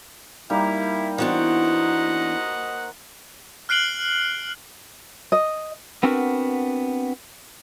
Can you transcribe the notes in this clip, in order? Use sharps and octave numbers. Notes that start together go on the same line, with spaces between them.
G3 A#3 D#4 E4
E3 B3 D4 F#4 C5 D#5 F#5
F6 F#6 C7 D7 F#7 G7
D#5
B3 C4 D4 F#4 A#4 B4